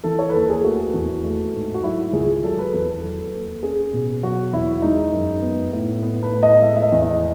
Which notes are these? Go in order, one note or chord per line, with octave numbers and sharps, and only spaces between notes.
E3 A4
C#5
B4
D#2 A4
G#4
A3 F#4
E2
A3
G#2
F#4
F#3 E4
C#2 G#4
F#3 A4
B4
E2 B4
A4
F#3
D#2
C#4 G#4
B2
F#3 F#4
E2 E4
G#3 D#4
F#2
B3
A2
B3
B4
A2
D#5
G#3 E5
E5
D#5
E2
D#5